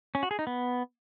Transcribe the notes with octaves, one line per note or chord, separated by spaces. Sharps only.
C#4
F#4
G#4
D#4
B3